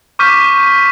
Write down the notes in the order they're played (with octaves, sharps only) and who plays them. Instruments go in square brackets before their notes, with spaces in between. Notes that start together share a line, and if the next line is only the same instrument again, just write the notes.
[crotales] C#6 D6 F6 G6 B6 D#7